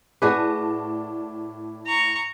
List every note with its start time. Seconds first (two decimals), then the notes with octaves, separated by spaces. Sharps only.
0.22 A2 F#4 G#4 B4 D5 A5 D6
1.86 A#5 C#6